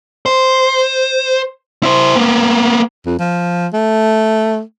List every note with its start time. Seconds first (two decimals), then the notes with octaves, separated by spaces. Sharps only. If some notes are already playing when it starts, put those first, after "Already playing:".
0.26 C5
1.83 E4 C5
2.16 A#3 B3
3.06 F2
3.19 F3
3.73 A3